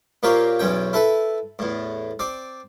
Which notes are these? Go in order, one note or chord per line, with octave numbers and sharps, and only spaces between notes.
A#2 A#3 G4 C5 C#5
B1 E2 C#4 G5
E4 A4 B4
E2 A2
C4 D5